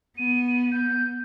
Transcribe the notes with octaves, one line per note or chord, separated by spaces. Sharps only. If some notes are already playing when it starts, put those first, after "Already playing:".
B3 D#7
G6